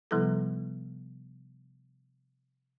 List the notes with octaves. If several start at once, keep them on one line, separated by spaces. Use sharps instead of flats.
C3 F3 G3 B3 E4 A4